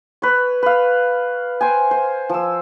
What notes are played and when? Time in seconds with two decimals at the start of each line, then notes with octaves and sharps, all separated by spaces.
0.22 B4 C#5
0.62 B4 F5
1.61 C5 G5 G#5
1.91 C5
2.29 F3 E6